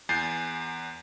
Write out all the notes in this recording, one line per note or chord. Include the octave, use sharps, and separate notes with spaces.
E2 G#5 G6 A6 C7